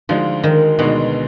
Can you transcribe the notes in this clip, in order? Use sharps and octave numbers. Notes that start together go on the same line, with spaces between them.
D2 D3 F3 G#3 D#4
D#3
D2 B2 D3 G#3 D#4